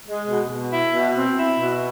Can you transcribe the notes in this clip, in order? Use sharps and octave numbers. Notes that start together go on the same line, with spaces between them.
G#3
B2
B2
E4
B2
C4
E4
B2